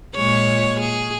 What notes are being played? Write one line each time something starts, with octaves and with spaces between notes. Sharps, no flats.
A#2 G#3 C#5
G#4